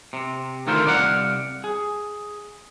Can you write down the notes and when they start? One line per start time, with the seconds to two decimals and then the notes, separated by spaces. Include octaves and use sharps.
0.13 C3
0.67 D2 D#3 A3 F4 A#4 C5
0.86 C2 D5 F5 F#5
1.64 G#4